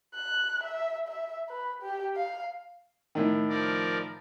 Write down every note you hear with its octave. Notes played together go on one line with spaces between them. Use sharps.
F#6
E5
E5
B4
G4
F5
A2 D#3
F3 A#4 D5